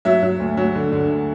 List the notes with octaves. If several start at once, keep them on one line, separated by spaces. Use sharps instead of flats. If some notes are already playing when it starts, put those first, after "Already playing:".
F#3 E5
F#3
D2
F#3
D3
D3